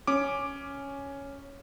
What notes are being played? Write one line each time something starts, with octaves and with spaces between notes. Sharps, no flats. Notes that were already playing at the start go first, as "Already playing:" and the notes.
C#4 D6